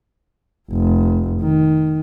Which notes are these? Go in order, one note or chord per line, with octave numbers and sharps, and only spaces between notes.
F1
D#3